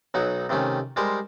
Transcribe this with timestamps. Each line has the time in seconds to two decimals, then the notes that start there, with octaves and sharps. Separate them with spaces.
0.14 B1 F#3 D#4 F#5
0.49 C3 D#3 A3 C#4
0.96 G3 G#3 A#4 C5